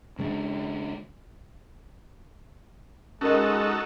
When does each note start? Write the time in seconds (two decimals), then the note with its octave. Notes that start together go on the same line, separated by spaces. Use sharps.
0.19 C#3 G#3 B3 D4
3.21 G#3 C#4 D#4 F#4 A4 A#4 D#5